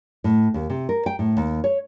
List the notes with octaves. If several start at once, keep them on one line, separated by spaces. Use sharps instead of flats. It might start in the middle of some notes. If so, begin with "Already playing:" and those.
A2
D#2
C3
A#4
G5
A2
D#2
C#5